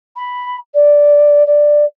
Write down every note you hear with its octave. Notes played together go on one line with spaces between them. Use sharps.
B5
D5
D5